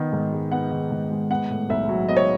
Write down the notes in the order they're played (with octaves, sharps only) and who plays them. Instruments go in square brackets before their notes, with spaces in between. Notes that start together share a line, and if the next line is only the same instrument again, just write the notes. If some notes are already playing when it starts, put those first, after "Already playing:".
Already playing: [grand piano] D#3 B3
G#2
G#3
[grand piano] B3 [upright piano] F#5
[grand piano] D#3
G#2
G#3
[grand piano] B3 [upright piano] F#5
[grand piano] A2
[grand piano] B1 [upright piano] E5
[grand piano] F#3
[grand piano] B3 [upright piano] D#5
[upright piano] C#5